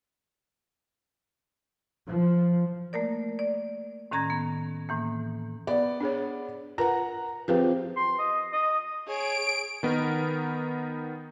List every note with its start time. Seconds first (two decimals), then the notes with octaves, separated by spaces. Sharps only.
2.05 F3
2.93 A3 A#3 A#4 D5
3.39 D5
4.11 A2 D#3 C#4 A#5 G#6 A#6
4.30 B3
4.89 A2 E3 A#3
5.67 B3 D5
6.00 D4 G#4 C#5
6.78 F4 A#4 B4 F#5 A#5
7.48 F3 C4 G4 G#4 B4 F5
7.97 C6
8.19 D#5
8.53 D#5
9.08 G#4 C#5 D7
9.83 D#3 B3 D#4 A#4